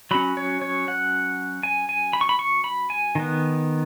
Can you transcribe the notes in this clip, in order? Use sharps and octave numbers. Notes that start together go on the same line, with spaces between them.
F#3 C#4 B5
C#5
C#5
F#5
G#5
G#5
B5
C#6
B5
C#6
B5
G#5
D#3 B3